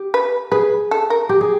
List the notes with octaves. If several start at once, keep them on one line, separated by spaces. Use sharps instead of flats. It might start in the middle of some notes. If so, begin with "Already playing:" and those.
Already playing: G4
B4
G#4 B4
A4
A#4
G4
G#4